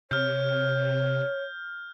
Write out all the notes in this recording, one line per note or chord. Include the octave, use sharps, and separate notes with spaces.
C3 C#5 F6 G6